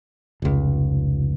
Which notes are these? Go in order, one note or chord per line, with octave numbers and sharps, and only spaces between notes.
F1 C#2